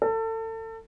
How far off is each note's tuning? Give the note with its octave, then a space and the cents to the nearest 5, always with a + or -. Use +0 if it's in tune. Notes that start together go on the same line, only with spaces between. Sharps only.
A4 +30